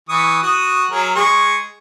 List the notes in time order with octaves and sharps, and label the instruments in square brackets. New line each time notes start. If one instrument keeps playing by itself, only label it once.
[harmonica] E3 C#6 D#6
F#4 D#6
F#3 G#4 A#4
G#3 G#4 C#6